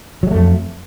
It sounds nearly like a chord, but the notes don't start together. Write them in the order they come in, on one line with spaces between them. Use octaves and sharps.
F#3 G#3 A3 F2